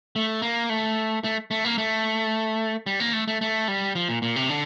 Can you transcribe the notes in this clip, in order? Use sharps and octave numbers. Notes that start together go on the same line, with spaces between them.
A3
A#3
A3
A3
A3
A#3
A3
G3
A#3
A3
A3
A3
G3
F3
A#2
A#2
C3
D3